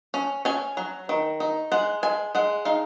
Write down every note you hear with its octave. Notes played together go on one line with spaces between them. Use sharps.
C#4
C#4 G#5
F#3
D#3
D#4
G#3 F#5
G#3 G#5
G#3 F#5
D#4 F5